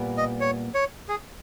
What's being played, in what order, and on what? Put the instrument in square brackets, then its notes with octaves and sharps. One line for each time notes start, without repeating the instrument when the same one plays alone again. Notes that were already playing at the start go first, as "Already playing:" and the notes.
Already playing: [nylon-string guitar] A#2 G3 B3
[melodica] D#5
C#5
C#5
G#4